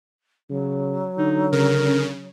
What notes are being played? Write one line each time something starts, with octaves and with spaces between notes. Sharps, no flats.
C#3 F#3
D3 D#4
C#3 A#4